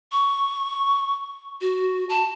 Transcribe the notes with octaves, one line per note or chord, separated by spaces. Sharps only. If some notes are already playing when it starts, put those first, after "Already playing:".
C#6
F#4
A5